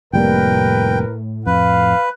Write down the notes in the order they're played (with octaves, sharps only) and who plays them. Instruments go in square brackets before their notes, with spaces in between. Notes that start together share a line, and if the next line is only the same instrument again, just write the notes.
[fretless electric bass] F1 G3 A#3 [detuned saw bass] A2 [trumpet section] A#4 B4 [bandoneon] G5
[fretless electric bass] F2 [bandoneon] B4 [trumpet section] F5